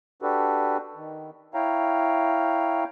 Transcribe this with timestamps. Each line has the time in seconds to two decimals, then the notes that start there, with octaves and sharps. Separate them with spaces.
0.22 D4 F#4 G4 A4 B4
0.95 D#3
1.54 E4 C#5 F5 G5 A#5